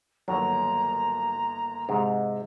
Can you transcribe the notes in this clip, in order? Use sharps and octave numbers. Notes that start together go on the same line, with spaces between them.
G1 D#2 F#3 A#5
G#2 C3 G#3